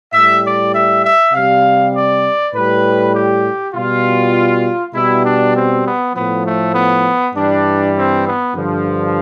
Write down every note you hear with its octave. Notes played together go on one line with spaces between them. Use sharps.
A2 G3 E5
D5
E5
E5
C3 G3 F5
D5
A2 G3 B4
G4
B2 G3 F4
B2 G3 E4
D4
C4
B3
A2 F3 B3
A3
B3
G2 E3 G3 D4
C4
B3
G2 D3 F3